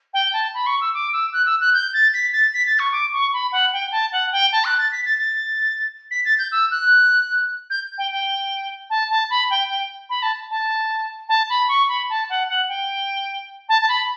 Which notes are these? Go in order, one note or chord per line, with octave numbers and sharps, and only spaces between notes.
G5
A5
B5
C#6
E6
D6
E6
F#6
E6
F#6
G6
A6
B6
A6
B6
A6
C#6
D6
C#6
B5
F#5
G5
A5
F#5
G5
A5
F#6
A6
B6
A6
A6
B6
A6
G6
E6
F#6
G6
G5
G5
A5
A5
B5
G5
G5
B5
A5
A5
A5
B5
C#6
B5
A5
F#5
F#5
G5
A5
A5
B5